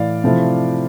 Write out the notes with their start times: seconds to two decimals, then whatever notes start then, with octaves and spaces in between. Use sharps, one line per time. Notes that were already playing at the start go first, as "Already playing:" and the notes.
Already playing: A2 E3 D5 F5
0.24 C3 F3 A3 E4